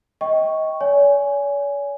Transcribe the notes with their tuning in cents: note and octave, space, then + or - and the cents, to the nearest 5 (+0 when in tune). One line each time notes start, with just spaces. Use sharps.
D#5 +25 G5 +0 C#6 +0
C#5 +45 G#5 +0